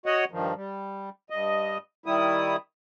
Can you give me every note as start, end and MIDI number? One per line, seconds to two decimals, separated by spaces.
0.06 0.25 66
0.06 0.25 73
0.06 0.25 75
0.06 0.25 78
0.31 0.54 43
0.31 0.54 51
0.31 0.54 53
0.55 1.10 55
1.30 1.78 43
1.30 1.78 75
2.06 2.56 51
2.06 2.56 55
2.06 2.56 64
2.06 2.56 87